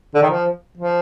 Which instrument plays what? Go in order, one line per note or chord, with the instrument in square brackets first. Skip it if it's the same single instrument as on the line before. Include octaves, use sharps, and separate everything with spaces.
[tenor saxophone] D3
D#3
F3
F3